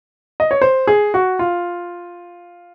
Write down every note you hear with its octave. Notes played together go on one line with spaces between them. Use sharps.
D#5
C#5
C5
G#4
F#4
F4